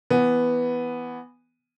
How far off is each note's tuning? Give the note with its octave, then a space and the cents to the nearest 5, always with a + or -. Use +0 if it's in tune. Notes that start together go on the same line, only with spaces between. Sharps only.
E3 +0 B3 +0